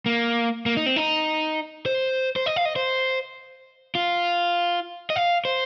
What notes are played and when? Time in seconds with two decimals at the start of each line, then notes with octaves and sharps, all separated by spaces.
0.06 A#3
0.66 A#3
0.77 D#4
0.86 C4
0.96 D#4
1.86 C5
2.36 C5
2.46 D#5
2.56 F5
2.65 D#5
2.76 C5
3.95 F4
5.10 D#5
5.16 F5
5.45 C5